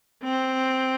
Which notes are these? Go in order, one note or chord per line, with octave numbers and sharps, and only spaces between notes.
C4